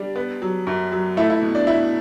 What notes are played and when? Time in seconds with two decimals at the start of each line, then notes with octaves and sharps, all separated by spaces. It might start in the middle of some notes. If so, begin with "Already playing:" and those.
Already playing: G3 D4
0.16 B3
0.42 F#3
0.67 F#2
0.92 F#3
1.17 A3 E4
1.30 E4
1.42 B2
1.55 D4
1.67 B2 E4